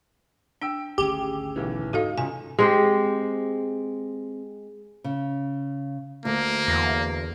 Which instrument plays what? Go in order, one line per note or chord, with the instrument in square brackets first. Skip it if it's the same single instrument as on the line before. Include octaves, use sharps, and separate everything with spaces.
[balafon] D4 [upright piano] G5 E6 D7
[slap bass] G#1 D2 C#4 [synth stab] G4 [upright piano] G#4
[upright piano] B1 E3
[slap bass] G#2 [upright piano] D#4 [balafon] F#4 A4 F5
[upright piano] C#2 [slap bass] C#4 [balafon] G#5
[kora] G#3 C4 G4
[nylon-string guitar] C#3
[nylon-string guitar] D2 [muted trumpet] A#3
[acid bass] E2